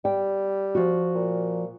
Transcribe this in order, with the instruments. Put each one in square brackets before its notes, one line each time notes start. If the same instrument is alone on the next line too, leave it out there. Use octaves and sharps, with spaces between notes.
[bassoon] G3 [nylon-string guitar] G5
[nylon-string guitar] F3 F#4
[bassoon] A#2